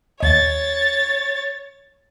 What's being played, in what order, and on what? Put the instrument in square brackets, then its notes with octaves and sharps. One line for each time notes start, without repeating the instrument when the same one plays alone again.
[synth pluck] D#2 D#5 [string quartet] C#5 A6